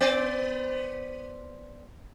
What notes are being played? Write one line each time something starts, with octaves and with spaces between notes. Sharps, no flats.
B3 C5 D5